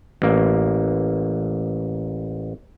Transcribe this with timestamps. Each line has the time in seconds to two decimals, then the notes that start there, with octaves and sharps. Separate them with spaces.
0.22 A1 A#3